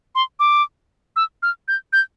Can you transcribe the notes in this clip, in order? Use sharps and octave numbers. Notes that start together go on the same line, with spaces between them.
C6
D6
E6
F6
G6
G6